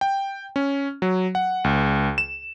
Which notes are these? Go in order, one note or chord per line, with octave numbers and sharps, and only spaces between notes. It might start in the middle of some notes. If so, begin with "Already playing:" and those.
G5
C#4
F#3
F#5
C#2
E7